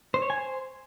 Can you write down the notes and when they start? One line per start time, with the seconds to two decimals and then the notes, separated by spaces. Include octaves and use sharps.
0.14 C5
0.22 C#5
0.30 G#5
0.38 C5